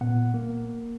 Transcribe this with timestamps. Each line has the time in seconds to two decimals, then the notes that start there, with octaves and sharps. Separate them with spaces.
0.01 A#2 B3 F#5
0.34 A#3